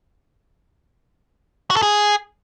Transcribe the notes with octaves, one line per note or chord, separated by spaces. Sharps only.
F#4
A4
G#4